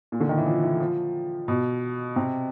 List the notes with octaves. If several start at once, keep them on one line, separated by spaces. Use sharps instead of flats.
A#2
D3
D#3
E3
F3
E3
F3
B2
C3